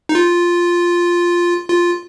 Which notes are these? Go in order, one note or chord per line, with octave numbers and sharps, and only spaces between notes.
D#4
F4
F4